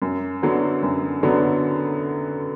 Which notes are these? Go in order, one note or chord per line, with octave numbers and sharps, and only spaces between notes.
F#2
D3 F#3 B3
F#2
D3 F#3 B3